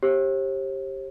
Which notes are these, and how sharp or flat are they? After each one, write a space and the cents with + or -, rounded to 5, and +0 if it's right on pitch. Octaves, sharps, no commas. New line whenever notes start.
G4 +0 C5 +45